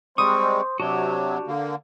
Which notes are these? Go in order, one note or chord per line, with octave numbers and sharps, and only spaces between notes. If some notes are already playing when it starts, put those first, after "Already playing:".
G3 G#3 C4 C5 C#6 D#6
C3 F#3 D4 F#4 G4
D3 A#3